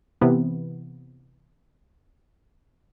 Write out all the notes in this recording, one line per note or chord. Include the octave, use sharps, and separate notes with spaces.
C3 E3 B3